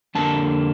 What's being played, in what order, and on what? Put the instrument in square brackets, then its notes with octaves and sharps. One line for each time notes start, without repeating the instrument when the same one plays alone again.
[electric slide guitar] F2 D3 G3 A#3 A5